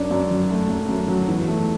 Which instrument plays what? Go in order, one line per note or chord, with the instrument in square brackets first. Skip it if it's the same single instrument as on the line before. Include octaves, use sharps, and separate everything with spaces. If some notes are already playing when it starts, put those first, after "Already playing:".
Already playing: [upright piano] F#2 F#3 D4
F#2
F#3
A3
F#2
F#2
F#3
E2
A3